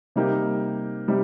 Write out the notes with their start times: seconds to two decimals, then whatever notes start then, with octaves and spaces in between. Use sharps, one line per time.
0.16 C3 G3 A#3 D#4 G4
1.08 C3 G3 D#4 G4